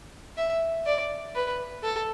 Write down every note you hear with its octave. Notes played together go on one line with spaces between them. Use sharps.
E5
D5
B4
A4